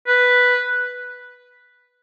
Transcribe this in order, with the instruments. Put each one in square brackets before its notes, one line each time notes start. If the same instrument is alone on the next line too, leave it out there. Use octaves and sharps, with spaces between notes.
[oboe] B4